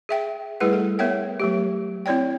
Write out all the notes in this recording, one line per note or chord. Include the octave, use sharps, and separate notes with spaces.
G#4 E5 G5
G3 A3 E4 G#4 B4 F#5
A4
B3 A#4 C#5 E5 F#5 G5
F#3 A3 G4
C4 E4 C#5 D5 G5